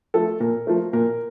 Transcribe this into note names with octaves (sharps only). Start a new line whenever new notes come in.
F3 A3 A4
A#2 A#4
F3 A3
A#2 A#4